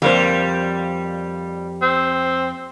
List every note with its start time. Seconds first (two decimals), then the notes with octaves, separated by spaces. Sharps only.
0.02 F2 G3 A#3 C5
1.82 C4